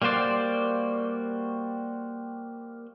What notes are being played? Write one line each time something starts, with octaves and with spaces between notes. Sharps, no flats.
G3 A#3 F#4 C5 D5